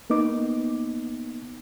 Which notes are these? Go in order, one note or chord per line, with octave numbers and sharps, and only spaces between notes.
A#3 B3 D#4 D6